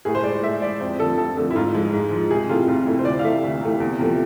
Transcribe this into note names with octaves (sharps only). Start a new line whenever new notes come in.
A2 G#4
C5
G#3 D5
A2 E5
G#3 D5
F2 C5
D3 F3 A3 A4
F2 A4
D3 F3 A3 A4
E4
G#2 F4
F3 G#3
G#2
F3 G#3
C2 G#4
C3 E3 A3 F4
C2 F4
C3 E3 A3 E4
C5
D2 D5
F5
C3 E3 A3 E5
D2
C3 E3 A3
E2
C3 F3 A3